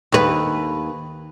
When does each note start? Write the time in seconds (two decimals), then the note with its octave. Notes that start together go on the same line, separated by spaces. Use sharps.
0.12 D#2 B4